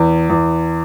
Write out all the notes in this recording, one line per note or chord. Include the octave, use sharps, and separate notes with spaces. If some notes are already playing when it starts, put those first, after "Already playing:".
Already playing: E2
E2